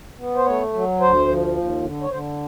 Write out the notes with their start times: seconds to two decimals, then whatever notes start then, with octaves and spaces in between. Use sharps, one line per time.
0.18 B3
0.36 C5
0.46 A3 C#5
0.73 F#3
1.00 D2 C5
1.28 F3
1.55 D#2
1.83 D3
2.02 C#5
2.10 D3 C5